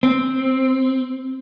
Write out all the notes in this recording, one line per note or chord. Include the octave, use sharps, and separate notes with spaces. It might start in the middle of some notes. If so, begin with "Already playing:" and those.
C4